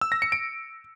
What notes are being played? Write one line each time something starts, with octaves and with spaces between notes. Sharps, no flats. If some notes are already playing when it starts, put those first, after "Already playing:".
E6
A#6
C#7
D7